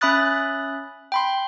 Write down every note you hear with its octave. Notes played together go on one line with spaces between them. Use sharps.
C#4 E5 B5 D#6 F#6 A6
G5 B5 C6